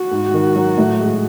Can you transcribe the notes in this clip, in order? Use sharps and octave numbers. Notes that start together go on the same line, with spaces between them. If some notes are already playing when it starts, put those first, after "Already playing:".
Already playing: F#4
G#2
D#3
F#3
A2
G#3